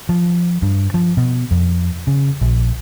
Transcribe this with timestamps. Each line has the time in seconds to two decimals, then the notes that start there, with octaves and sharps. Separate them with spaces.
0.09 F3
0.62 G2
0.94 F3
1.17 B2
1.51 F2
2.07 C#3
2.41 A#1